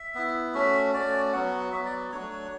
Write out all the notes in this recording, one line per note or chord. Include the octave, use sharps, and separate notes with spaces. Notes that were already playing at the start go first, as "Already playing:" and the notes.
Already playing: E5
B3 E4
A3 C#4 F#4 E5
A3 C#4 F#4 D5
F#3 B3 F#4 F#5
F#3 B3 F#4 E5
D5
F#3 A3 D4 F#4 C#5